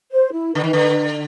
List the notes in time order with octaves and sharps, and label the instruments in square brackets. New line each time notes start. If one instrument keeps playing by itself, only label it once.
[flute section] C5
E4
[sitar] D3 [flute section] B4
[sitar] D#3
D3